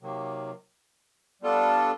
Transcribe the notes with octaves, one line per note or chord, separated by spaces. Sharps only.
C3 D#3 F#3 A#3
G3 B3 D4 F4 A4